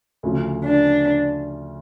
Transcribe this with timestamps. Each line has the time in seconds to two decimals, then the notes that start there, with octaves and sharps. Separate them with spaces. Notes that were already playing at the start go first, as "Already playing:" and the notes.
0.23 D2 C#3 F3
0.65 D4